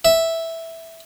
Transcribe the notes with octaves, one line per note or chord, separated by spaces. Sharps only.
E5